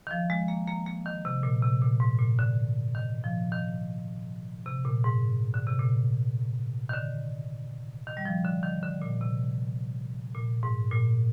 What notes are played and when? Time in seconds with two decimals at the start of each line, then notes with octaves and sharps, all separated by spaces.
0.07 D#3
0.11 F3
0.30 G#3
0.48 A#3
0.67 A#3
0.86 A#3
1.06 D#3
1.25 C3
1.43 A#2
1.63 C3
1.82 A#2
2.00 G#2
2.19 A#2
2.39 D3
2.95 D#3
3.24 F3
3.52 D#3
4.66 C3
4.84 A#2
5.04 G#2
5.54 D3
5.67 C3
5.79 A#2
6.89 D#3
6.94 D3
8.07 D#3
8.17 G3
8.25 F3
8.45 D3
8.63 D#3
8.83 D3
9.02 A#2
9.21 C3
10.34 A#2
10.63 G#2
10.92 A#2